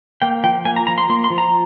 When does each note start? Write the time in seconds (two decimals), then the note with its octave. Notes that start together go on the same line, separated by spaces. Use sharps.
0.22 A#3 G5
0.44 F3 G5
0.65 A#3 G#5
0.76 A#5
0.87 F3 A#5
0.98 C6
1.10 A#3 C6
1.24 C6
1.30 F3
1.38 A#5